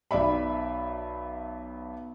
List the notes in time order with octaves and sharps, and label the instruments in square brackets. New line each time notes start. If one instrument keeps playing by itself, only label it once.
[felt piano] B1 D5 E5 B5